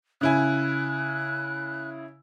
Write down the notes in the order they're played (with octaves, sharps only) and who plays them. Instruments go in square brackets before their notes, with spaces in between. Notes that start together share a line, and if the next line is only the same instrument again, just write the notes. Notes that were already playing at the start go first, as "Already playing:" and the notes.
[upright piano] C#3 E4 G#5 [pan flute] F#6